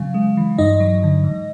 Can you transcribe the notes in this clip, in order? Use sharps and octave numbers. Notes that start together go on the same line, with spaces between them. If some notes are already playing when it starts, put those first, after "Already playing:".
Already playing: C#3 F#3 F5
G#3
E3
G2 D#4 D#5
F#3
D3
G#2